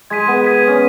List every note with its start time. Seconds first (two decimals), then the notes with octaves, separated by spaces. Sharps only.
0.10 G#3 G#6 B6 D#7
0.28 B3
0.45 G#6 B6 D#7
0.68 C#4